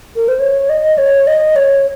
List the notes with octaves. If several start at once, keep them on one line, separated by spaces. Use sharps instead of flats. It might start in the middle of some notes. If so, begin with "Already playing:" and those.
A#4
C5
C#5
D#5
C#5
D#5
C#5